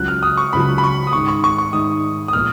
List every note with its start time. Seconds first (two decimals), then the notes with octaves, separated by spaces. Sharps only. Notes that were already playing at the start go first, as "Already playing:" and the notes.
Already playing: C#2 C#3 F#3 F#6
0.08 F6
0.23 D#6
0.37 C#6
0.53 C#2 C#3 F#3 B5
0.78 B5
0.84 C#6
1.07 D#6
1.13 G#2 D#3 G#3 C#6
1.28 C#6
1.44 C#6
1.58 C#6
1.73 G#2 D#3 G#3 D#6
2.28 D#6
2.33 A#2 F3 G#3 B3 F6